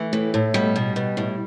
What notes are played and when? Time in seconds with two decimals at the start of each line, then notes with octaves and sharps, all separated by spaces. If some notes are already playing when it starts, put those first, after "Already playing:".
Already playing: E3 A3
0.13 A2
0.34 A2
0.54 B2 G3
0.76 B2
0.96 B2
1.17 A2